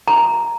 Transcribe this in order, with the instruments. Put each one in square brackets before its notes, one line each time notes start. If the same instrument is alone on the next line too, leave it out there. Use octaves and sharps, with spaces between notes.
[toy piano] A#5